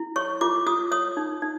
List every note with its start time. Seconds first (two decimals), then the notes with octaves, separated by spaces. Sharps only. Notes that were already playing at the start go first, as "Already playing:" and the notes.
Already playing: E4
0.16 C#5 C#6
0.41 F4 D6
0.66 F4 D#6
0.91 C#5 D#6
1.17 D#4
1.42 D#4